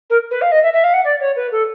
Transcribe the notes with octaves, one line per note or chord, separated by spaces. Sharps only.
A#4
B4
F5
D#5
E5
E5
F5
F#5
D5
C#5
B4
A4